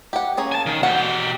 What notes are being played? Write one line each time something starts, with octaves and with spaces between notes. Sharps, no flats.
G4 F#5
A#3 C#4 G#4
G#5 A5
D#3
B2 G4 G#4 F#5